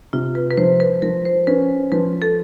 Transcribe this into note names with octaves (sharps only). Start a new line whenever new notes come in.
C3 F4
B4
B4
F3 C5
B4
F3 A#4
C5
C#4 B4
F3 B4
A4